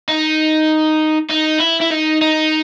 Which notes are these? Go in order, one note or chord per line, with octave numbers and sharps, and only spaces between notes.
D#4
D#4
E4
E4
D#4
D#4